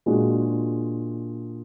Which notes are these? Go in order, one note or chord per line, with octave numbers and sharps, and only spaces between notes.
A#2 G#3 D4 F#4